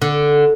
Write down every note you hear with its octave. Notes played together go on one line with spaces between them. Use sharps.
D3